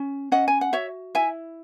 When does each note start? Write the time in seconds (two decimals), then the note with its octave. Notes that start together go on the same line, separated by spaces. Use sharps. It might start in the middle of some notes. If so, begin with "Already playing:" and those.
Already playing: C#4
0.32 C#4 D#5 F#5
0.48 G#5
0.61 F#5
0.73 F#4 C#5 E5
1.15 E4 E5 G#5